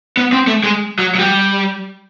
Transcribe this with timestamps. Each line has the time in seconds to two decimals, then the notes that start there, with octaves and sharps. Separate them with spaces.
0.17 B3
0.33 C4
0.47 A3
0.64 G#3
0.99 F#3
1.15 F#3
1.19 G3